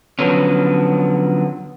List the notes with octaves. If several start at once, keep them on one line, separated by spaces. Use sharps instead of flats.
D3 F3 F#3 B3 C#4